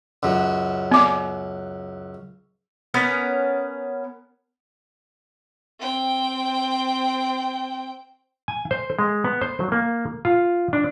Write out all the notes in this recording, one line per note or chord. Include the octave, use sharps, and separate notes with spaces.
C#2 F#2 F#3
B3 D6
B3 C#4 A#4 B4
C4 G5
G#5
C5
G#3
B3
C5
F#3
A#3
F4
D4